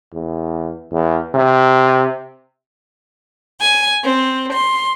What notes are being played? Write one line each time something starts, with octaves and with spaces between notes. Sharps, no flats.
E2
E2
C3
G#5
C4
C6